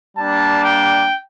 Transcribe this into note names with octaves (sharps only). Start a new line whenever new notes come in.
G3 A#3 D4 A5
G5